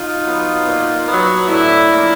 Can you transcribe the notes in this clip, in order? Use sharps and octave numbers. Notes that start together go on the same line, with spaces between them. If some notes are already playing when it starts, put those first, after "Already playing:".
Already playing: D#4 F4
F#3 B3
A#2
F#3 B3
A2 D4 E4
F3 A#3